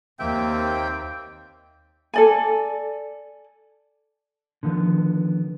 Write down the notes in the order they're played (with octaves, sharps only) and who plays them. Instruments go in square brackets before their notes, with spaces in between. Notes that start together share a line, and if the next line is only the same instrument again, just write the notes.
[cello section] D#2 [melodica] A#3 C4 E5 [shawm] G5
[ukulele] A4 D5 G#5
[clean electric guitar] D3 D#3 F3 B3